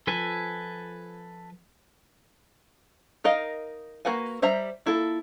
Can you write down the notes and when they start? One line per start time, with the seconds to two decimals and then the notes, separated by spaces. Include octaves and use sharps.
0.07 F3 A4 B4 G#5
3.24 D#4 A#4 D#5 F5
4.05 A#3 F#4 B4 F#5 G#5
4.42 G3 C5 E5 A#5
4.86 A#3 E4 F4 A4